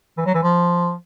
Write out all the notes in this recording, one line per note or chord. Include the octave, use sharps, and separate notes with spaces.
E3
F#3
E3
F3